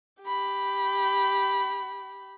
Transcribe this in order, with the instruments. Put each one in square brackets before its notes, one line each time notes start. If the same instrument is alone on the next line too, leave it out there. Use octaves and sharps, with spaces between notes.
[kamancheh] G4 B5